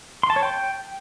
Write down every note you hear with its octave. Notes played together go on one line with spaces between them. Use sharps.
C6
A5
C#5
G5